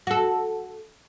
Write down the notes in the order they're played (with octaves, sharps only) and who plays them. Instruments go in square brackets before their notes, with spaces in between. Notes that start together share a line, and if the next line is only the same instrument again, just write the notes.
[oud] F#4 A4